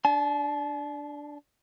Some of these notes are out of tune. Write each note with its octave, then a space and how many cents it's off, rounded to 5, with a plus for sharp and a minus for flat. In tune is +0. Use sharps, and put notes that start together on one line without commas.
D4 +0 A5 -40